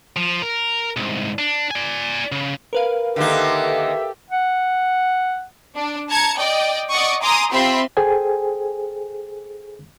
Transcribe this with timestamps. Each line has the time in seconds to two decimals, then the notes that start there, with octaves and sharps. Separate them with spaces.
0.16 F3
0.42 A#4
0.97 C2 G#2
1.39 D4
1.71 D5 G#5
2.32 C#3
2.73 A#4 B4 F5
3.16 D3 D#3 A#3 G4 A4 E5
4.30 F#5
5.75 D4
6.09 A5 A#5 G#6 C#7
6.38 D5 D#5 G5
6.90 D5 D#5 F#5 C#6 D#6
7.22 G#5 A#5 C6 D6 D#6
7.52 C4 F4 G4 E5 B5 C6
7.97 G#4 A4 C5 G5 G#5